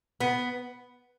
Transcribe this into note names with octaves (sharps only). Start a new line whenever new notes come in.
B3